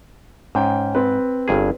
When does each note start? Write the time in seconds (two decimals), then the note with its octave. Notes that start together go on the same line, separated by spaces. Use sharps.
0.55 G#2 C#4 G5
0.95 C4 B4
1.48 G1 G2 G#4